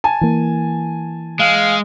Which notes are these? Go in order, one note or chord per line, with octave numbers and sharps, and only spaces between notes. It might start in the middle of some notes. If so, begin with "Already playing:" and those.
G#5 A5
E3 A#3
G#3 F5